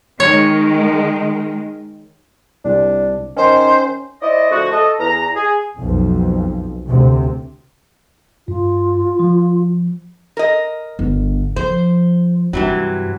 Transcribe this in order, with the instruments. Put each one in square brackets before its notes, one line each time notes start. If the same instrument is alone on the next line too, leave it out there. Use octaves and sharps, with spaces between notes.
[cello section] D#3 G#3 [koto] C#5
[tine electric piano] C2 C3 [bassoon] D4
[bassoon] D#3 [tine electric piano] C#4 [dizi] C5
[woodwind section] E4 C5 D5 D#5
D3 F3 A3 F#4
A4 D#5
E2 A#5
G#4
[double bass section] B1 F2
D2 C3
[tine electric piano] G2 [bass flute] F4
[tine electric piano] F3
[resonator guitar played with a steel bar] A#4 D#5
[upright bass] G1
[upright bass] F3 [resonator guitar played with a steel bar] C5
[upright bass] G2 D4 [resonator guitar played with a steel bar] C3 E3 F#3